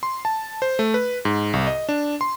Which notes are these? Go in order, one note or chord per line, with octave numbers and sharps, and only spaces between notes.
C6
A5
C5
A3
B4
G#2
C2
D#5
D4
C6